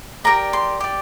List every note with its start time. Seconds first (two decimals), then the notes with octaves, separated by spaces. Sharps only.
0.24 G4 A#4 D5 A#5
0.53 C6
0.80 G4 D5